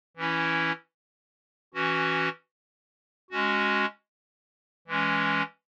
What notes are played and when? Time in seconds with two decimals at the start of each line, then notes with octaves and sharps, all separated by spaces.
0.17 E3 C#4 E4
1.74 E3 C#4 F#4
3.30 G#3 C#4 F#4
4.88 E3 G#3 C#4